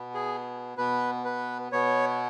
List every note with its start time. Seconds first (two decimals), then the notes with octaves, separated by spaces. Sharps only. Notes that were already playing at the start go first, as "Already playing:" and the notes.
Already playing: B2 B3
0.14 G#4
0.78 B2 B3 B4
1.25 B4
1.72 B2 B3 C#5